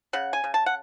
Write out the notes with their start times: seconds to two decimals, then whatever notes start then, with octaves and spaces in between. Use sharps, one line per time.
0.13 C#3 F#5
0.33 G#5
0.44 C#3
0.54 A5
0.66 F#5